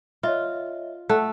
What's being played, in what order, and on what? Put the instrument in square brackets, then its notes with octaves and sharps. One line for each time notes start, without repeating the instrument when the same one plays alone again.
[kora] F4 [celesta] C#5 D#5 E5
[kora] A3 [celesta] F#5 F#6